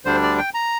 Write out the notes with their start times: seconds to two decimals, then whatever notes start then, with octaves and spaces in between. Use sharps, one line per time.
0.05 D2 D3 G3 D4 C5
0.23 D5
0.38 G5
0.54 A#5